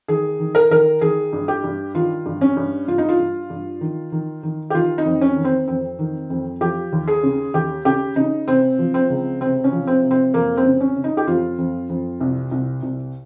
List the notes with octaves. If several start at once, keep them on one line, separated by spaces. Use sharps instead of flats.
D#3 G#4
D#3
A#4
D#3 A#4
D#3 G#4
G2
G4
G2
D#3 F4
G2
C#4
G2
G2 F4
D#4
F4
G2
G2
D#3
D#3
D#3
G4
D#3 F4
D#4
F2
C#4
D#3
C4
F2 C4
D#3
F2
F3 G4
D#2
G#4
C#3
D#2 G4
C#3 G4
C#3 D#4
C3 C4
F3
C4
C#2
C3 C4
C#4
F3
C4
C3
C4
F2 A#3
C4
C#3
C#4
C#3
D#4
G4
F2 F4
F2
F2
C2
C2
C2